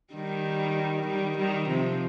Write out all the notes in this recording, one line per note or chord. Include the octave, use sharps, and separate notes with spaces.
D#3 G3
D#3 G3
D#3 G3
C3 F3